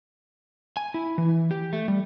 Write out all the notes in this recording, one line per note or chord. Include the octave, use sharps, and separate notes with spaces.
G#5
E4
E3
G4
A3
G3